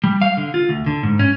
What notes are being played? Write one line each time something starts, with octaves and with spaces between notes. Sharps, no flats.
G3
F5
D3
F4
D2
D3
G#2
C#4